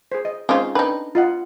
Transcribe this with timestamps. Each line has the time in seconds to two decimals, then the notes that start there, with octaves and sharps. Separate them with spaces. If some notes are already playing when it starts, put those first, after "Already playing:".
0.12 G#4 C5
0.25 D#5
0.49 G#3 C4 C#4 D#4 F4 C5
0.75 D4 D#4 B4 G5
1.15 F4 D#5 F#5